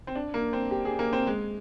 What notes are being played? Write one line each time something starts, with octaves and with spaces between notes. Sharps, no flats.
C4
D4
A#3
C4
G4
G#4
A#3
C4
G#3